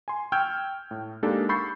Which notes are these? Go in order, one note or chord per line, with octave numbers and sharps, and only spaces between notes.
G#5 C6
G5 C#6 E6 F6 G6 G#6
A2
G#3 A#3 D4 D#4 G4 A4
B5 C#6 E6 G6 A6 C7